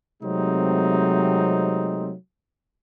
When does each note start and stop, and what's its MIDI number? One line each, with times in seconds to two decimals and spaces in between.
0.23 2.13 48
0.23 2.13 54
0.23 2.13 56
0.23 2.13 57
0.23 2.13 60
0.23 2.13 63